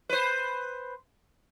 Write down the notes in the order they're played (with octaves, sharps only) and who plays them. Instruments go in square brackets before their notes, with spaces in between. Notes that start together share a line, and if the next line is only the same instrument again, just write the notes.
[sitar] B4 C5